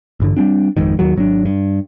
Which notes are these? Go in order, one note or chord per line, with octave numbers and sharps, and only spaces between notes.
A1 G2 D3
G3 G#3 C4 D4
G#1 F2 G#2 D#3
D#2 D#3 F#3
G#1 F#3 C#4 D4
G2